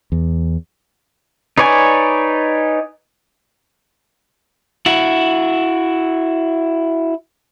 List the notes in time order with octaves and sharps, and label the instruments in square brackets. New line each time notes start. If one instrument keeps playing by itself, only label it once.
[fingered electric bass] E2
[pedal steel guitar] D#4 B4 C#5 D5 G#5
[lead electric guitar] E4 F#4